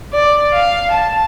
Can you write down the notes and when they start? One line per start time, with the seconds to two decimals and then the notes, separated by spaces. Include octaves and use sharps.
0.13 D5
0.53 F5
0.92 A5